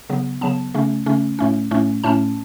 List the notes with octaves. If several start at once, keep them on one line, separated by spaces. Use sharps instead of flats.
C#3 F#3 B3
C#3 F#3 B3 A5
C#3 A3 C#4
C#3 A3 C#4
A2 A3 C#4
A2 A3 C#4
A2 A3 C#4 A5